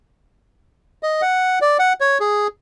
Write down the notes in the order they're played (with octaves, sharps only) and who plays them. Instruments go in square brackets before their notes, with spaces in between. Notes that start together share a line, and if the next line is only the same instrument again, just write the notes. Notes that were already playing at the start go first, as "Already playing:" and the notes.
[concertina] D#5
F#5
D5
F#5
C#5
G#4